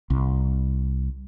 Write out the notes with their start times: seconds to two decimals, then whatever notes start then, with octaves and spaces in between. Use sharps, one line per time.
0.10 C2